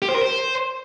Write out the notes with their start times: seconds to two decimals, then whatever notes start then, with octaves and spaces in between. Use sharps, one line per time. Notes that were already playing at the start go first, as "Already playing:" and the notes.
0.02 G4
0.09 C5
0.15 A#4
0.22 C5